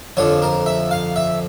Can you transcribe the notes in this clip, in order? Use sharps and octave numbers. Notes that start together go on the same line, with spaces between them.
F2 D3 F3 C#5
A#4
E5
F5
E5